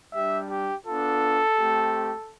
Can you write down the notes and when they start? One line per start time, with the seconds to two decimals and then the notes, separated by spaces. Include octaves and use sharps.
0.14 G3 D4 G4 E5
0.50 G4
0.85 B3 D4 F4 A4
1.57 A3 C4 G4